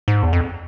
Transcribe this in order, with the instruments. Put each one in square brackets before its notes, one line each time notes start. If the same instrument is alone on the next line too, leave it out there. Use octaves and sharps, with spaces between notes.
[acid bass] G#2
E2
F2